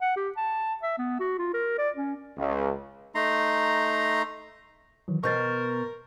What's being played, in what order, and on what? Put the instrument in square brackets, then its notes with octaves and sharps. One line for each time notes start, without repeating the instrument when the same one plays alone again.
[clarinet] F#5
G4
A5
E5
B3
F#4
F4
A#4
D5
C#4
[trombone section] C#2
[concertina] A3 D#4 A#5 C6
[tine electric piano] D#3 E3 F#3
[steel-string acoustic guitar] B2 C5 [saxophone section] A#4 [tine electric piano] C#6 G6 A6